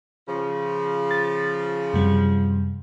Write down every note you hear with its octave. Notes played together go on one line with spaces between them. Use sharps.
C#3 F3
A6
F#2 C3 G3